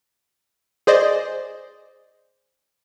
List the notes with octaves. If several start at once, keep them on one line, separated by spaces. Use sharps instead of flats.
G#4 C5 D5 D#5